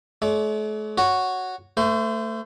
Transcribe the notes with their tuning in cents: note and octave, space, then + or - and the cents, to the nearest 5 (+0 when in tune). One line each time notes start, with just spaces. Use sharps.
A3 -45 C#5 +45
F#4 +0 C#5 +0
A3 +20 C5 -35